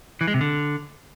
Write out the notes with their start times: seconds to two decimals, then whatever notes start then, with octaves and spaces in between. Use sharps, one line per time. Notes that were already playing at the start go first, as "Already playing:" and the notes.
0.21 E3
0.27 G#3
0.34 C3
0.41 D3